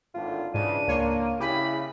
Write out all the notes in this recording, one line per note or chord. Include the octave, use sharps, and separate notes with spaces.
G#1 A2 D3 F4
G#2 C#3 E3 D4 D#7
C#2 A#3 C#5 C6
C#3 E4 G4 G#4 B5